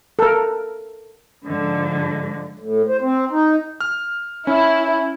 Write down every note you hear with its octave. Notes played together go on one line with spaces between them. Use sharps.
A4 A#4
G#2 D3 F3
A2
C5
C4
D#4
F6
C#4 E4